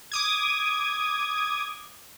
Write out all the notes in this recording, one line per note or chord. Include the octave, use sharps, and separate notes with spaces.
D6 D#6 G#6